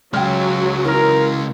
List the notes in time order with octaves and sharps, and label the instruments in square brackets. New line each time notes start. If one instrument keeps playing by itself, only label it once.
[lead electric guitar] C#3 G#3 [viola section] F#3 [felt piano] G5 F6
[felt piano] E3 [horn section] A#4